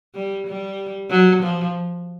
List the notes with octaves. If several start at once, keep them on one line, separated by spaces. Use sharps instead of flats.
G3
G3
F#3
F3